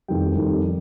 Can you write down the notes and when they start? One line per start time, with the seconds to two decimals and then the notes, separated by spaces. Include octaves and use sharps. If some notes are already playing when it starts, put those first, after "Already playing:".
0.08 F2 D#3 G3 G5
0.37 F2 D#3 G3